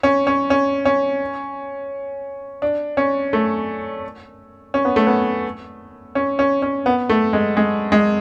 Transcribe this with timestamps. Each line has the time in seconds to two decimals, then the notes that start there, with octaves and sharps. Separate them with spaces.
0.03 C#4
0.27 C#4
0.50 C#4
0.85 C#4
2.62 D4
2.97 C#4
3.33 A3
4.74 C#4
4.85 B3
4.96 A3
5.07 B3
6.15 C#4
6.39 C#4
6.62 C#4
6.86 B3
7.09 A3
7.33 G#3
7.57 G#3
7.92 G#3